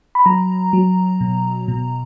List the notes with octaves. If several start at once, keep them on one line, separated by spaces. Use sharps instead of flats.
B5
F#3 A#5
F#3
B2
B2